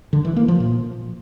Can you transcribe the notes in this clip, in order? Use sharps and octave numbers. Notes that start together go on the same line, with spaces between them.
D3
E3
A#3
F3
A#2